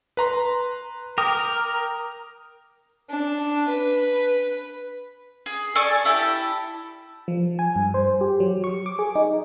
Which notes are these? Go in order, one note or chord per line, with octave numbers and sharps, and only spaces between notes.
B4 A#5 C6
A#4 G5 D6 D#6
D4
B4
G#4
A4 D5 G#5 C#6
E4 G4 A5
F3
G#5
G2
C5
G4
F#3
C#6
D6
G#4
D#4